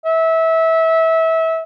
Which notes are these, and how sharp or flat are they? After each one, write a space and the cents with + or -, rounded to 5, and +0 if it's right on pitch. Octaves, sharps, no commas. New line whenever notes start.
E5 -25